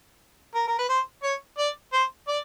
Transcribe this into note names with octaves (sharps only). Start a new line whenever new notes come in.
A#4
A#4
B4
C5
C#5
D5
C5
D5